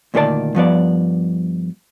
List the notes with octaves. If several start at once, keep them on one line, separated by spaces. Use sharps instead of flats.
D2 A#2 D#3 A4 D5 A5
G2 F3 B3 D5